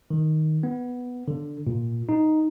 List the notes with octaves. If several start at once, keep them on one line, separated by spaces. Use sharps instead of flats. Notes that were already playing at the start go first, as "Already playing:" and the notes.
D#3
B3
D3
A#2
D#4